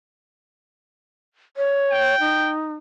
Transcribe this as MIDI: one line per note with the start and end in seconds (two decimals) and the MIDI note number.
1.57 2.15 73
1.90 2.51 79
2.20 2.74 63